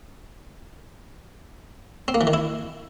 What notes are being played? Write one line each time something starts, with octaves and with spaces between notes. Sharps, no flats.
C4
A#3
E3
D#3
E4